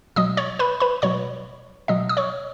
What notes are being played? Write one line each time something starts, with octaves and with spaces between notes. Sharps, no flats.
B2 F#3 D#5 D#6
C#5 C#6
B4 B5
B4 B5
B2 F#3 C#5 C#6
B2 F#3 D#5 D#6
D#6
C#5 C#6